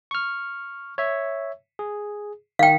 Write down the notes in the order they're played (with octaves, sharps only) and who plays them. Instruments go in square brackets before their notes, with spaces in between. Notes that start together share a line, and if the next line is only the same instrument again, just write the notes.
[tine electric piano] C#6 F6
C#5 E5
G#4
[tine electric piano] D#3 [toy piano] F5 G5